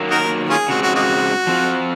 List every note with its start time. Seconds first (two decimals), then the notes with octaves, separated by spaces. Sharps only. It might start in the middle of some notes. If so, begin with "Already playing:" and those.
Already playing: D#3 F#3 A#3
0.10 D#4 F#4 A#4
0.49 C#4 F4 G#4
0.68 C#3 G#3 C4 F#4
0.82 F#4
0.95 A#3 D#4 F#4
1.47 F3 C4 F4